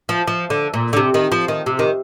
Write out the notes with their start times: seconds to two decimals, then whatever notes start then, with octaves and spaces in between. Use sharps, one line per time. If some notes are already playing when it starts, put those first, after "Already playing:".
0.09 F3
0.27 F3
0.50 D3
0.74 A#2
0.93 D3
0.97 C3
1.14 D#3
1.32 F3
1.48 D#3
1.66 C3
1.79 D#3